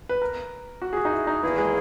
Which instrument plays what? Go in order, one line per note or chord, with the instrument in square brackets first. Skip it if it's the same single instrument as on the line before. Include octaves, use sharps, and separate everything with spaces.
[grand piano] B4
A#4
F#4
G#4
F#4
D#4
E4
D#4
[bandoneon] E2 D#3 A#3 E4 G#4 [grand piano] B3
[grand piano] G#3